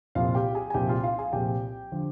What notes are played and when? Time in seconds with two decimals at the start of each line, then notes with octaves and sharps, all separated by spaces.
0.15 C2 A#2 F3 F4 F5
0.35 G4 G5
0.54 G#4 G#5
0.70 G#5
0.74 C2 A#2 F3 G4 G5
0.89 F4 F5
1.03 F4 F5
1.18 G#4 G#5
1.33 C2 A#2 F3 G4 G5
1.92 D3 F3